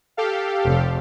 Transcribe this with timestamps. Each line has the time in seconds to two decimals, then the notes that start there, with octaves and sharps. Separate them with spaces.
0.17 G4 A4 F5
0.63 F1